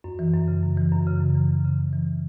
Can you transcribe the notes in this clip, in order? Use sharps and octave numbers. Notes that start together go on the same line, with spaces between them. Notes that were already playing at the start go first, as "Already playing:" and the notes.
F#2
E3
F#2
C#3
F#2
E3
F#2
C#3
F#2
E3
F#2
C#3
F#2
E3